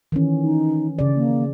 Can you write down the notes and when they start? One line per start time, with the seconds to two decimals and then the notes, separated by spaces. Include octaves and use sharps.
0.12 D#3 E3 C#4
0.43 D#4
0.99 C#3 D5
1.16 A#3